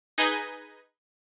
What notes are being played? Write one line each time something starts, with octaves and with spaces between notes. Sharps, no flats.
D#4 G#4 B4 D#5 G#5